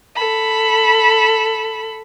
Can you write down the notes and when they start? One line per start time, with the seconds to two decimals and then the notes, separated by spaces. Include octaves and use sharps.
0.15 A4 B5